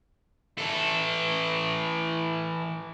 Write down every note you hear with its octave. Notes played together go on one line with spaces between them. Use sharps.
E3 A4